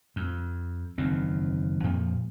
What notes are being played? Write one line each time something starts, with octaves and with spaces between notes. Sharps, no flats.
F2
F#1 E2 D#3 C4
F2 A#2 F3